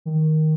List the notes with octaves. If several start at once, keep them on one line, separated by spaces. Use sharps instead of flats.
D#3